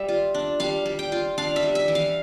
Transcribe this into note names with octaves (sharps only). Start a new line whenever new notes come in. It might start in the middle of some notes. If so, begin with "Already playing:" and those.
Already playing: G3 E5
F4
D4
G3 F5
G3
G5
F4
D4 F5
E5
G3
E5
E3
F5